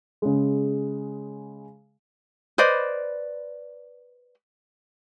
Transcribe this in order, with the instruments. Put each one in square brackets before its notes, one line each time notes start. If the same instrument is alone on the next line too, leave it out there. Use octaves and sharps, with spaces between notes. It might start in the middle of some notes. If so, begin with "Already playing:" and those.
[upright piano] C#3 G#3
[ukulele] B4 C5 D5 D#5